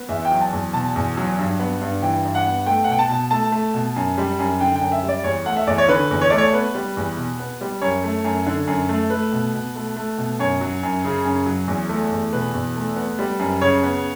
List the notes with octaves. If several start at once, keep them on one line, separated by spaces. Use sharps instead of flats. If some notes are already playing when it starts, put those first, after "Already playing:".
Already playing: B3
E2 E5
G5
F#3
A5
E2
B2 A5
E2
F#3
G2
B3
G2
E3 G5
G2
F#5
B3
A3 G5
F#5
B2 G5
A5
B2
A3 A5
A3
B2
F#2
G3
F#2
D3 G5
G5
F#2
E5
G3
D5
E2 C#5
A3 F#5
E5
E2 D5
C#5
D3 B4
E2
C#5
A3 D5
C#5
B3 B4
G3
E2
B2
B3
G3
F#2 C#5
A3
F#2
D3
F#2
A3
A3 B4
B2
B2
A3
A3
B2
F#2 C#5
F#3
F#2
C#3
F#2
F#3
E2
A3
E2
B2 B4
E2
A3
B3
G3
F#2
C#3 C#5
B3